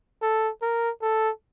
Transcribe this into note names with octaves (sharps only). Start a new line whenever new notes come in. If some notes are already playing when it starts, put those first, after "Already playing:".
A4
A#4
A4